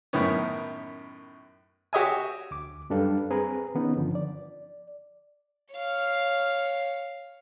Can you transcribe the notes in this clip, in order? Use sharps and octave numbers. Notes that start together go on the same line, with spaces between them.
F#2 A2 D#3 B3 C#4
F#4 G4 C#5 D#5 E5 G#5
D2 D6
F#2 G3 D4 A4 B4 F5
C4 G#4 B4 A#5
D#3 B3 C#4 D#4
G2 D3 F3
D5
C#5 F5